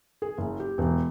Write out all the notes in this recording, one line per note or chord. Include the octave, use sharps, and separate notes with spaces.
G#4
F#1
G4
E1